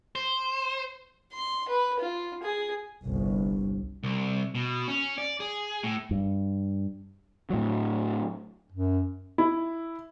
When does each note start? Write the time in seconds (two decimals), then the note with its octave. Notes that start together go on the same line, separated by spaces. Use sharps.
0.15 C5
1.33 C6
1.69 B4
2.00 F4
2.43 G#4
3.04 G1 C2
4.03 C2
4.55 B2
4.88 C#4
5.18 D5
5.40 G#4
5.83 A2
6.11 G2
7.50 A2 F#3
8.72 F#2
9.38 E4